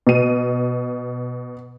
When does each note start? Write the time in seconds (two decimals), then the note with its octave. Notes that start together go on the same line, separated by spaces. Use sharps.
0.07 B2 D#7